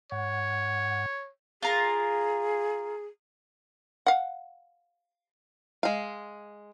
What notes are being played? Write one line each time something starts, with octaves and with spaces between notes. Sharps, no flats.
G#2 C#5 F#5
F4 G#4 A#4 A#5
F5 F#5
G#3 F5